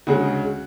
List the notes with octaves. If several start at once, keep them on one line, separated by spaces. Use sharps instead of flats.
D2 C#3 G#3 F#4